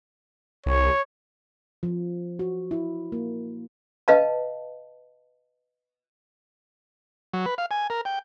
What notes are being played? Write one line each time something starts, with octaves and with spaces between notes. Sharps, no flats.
C2 C#5
F3
F#4
E4
A#3
B4 D#5 F5 A5
F#3
B4
F5
G#5
A#4
G5